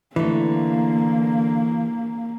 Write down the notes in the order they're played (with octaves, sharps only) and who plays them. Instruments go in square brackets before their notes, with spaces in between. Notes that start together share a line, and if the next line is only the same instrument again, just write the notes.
[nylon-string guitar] D3 A3 [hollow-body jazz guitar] E3 [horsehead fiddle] A#3